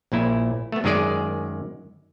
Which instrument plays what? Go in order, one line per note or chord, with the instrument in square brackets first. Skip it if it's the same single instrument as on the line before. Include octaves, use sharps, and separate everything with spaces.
[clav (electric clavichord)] A#1 A#2 E4
A3 B3
F#2 D#3 G#3 G#4 D5